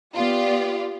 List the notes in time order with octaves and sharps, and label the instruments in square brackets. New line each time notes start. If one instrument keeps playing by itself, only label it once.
[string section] B3 F4 D5 [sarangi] G4